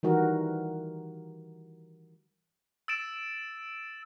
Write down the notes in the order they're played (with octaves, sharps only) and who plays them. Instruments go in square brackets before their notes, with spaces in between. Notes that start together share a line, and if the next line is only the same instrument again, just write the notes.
[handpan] D#3 E3 G3 F#4 A#4
[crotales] E6 A6 D7 E7